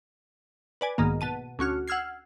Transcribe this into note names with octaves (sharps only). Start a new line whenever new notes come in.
B4 D5 G#5
B1 G#2 D#3 A#3
B2 A5 D#7
D2 C#4 F#4 F6
F#5 E6 F6 G#6 C7